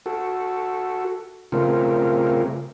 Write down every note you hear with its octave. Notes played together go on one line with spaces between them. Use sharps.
F#4 A4
C#3 A3 C4 F4 A#4